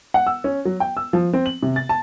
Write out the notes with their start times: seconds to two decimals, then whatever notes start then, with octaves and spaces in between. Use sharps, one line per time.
0.14 F#5
0.27 E6
0.44 C#4
0.65 F#3
0.80 G5
0.97 E6
1.13 F3
1.33 C4
1.46 F#7
1.63 C3
1.76 A6
1.89 A5